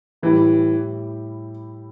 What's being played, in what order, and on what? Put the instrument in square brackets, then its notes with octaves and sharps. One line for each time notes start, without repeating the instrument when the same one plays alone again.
[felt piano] A2 G3 E4 G4 [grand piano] E3